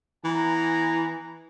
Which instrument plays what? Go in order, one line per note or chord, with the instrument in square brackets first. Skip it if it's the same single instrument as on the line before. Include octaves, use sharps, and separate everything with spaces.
[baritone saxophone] E3 [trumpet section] B3 G#5 A#5